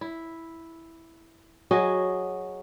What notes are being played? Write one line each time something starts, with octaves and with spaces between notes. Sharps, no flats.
E4
F#3 F#4 G#4 D#5